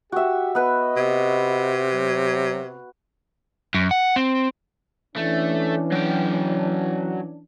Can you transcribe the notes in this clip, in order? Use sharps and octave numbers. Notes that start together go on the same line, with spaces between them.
F#4 G4 E5
B3 B4 D#5
C3
F#3
F#2
F#5
C4
E3 A3 C#4 D4
F#3 G5